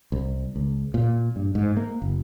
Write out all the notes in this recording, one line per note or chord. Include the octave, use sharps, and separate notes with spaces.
C2
C#2
A#2
G2
G#2
A#3
F#1